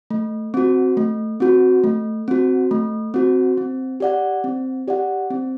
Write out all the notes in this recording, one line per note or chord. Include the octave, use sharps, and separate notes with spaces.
A3
C4 F#4
A3
C4 F#4
A3
C4 F#4
A3
C4 F#4
C4
G4 D5 F#5
C4
G4 D5 F#5
C4